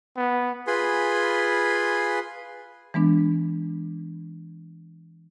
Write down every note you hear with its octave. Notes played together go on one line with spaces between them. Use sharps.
B3
F4 G#4 B4 G#5 B5 C6
E3 G#3 B3 D4